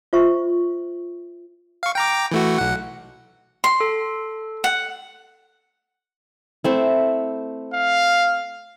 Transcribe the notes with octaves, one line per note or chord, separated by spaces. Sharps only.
F4 C5 E5 C#6
F5 C#6
G5 A#5 D6
E3 A3 F#4
B1 F#5
C6
A4
F#5
A3 C4 E4
F5